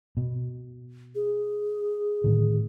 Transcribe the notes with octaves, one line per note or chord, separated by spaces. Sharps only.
B2
G#4
A2 D3 D#3